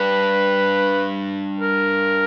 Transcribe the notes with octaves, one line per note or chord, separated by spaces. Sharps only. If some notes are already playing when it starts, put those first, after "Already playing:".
Already playing: G2 B4
A#4